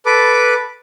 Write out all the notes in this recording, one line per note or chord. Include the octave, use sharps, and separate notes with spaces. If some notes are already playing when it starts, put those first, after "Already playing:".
A4 B4 D6